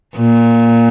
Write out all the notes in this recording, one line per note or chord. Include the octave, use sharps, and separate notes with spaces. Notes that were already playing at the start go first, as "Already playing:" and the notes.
A#2